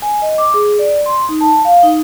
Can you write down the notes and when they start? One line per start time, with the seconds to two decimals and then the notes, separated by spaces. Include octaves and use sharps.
0.02 G#5
0.22 D#5
0.38 D6
0.54 G#4
0.79 D5
1.06 C6
1.29 D#4
1.41 A5
1.65 F5
1.83 D#4